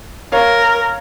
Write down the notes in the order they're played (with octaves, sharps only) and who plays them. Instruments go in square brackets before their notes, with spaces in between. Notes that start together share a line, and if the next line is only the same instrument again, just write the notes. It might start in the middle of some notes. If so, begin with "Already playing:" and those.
[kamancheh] A#4 [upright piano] C#5 F5